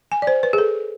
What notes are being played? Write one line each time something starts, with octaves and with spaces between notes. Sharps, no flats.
G#5
D5
C5
B4
G#4
A4